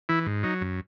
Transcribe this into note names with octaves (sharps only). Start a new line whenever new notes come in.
E3 E4
G#2
F#3 D#4
F#2